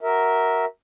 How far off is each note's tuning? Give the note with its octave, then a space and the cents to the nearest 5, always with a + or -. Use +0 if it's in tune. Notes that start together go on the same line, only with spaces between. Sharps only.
F#4 +10 A#4 +0 E5 -15